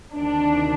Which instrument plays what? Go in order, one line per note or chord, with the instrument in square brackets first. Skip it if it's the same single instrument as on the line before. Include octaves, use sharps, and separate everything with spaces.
[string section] D2 C3 D#3 D4